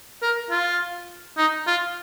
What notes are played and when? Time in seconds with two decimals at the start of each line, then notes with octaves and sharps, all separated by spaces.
0.22 A#4
0.51 F4
1.37 D#4
1.67 F4